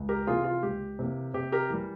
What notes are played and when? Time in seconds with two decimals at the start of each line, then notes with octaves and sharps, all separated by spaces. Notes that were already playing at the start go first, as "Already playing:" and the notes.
Already playing: C#2
0.09 G4 A#4
0.27 C3 E3 A#3 F4 G#4
0.44 F4
0.63 C#2 G4
0.99 C3 E3 A#3
1.34 C3 G4
1.52 G4 A#4
1.70 E3 G3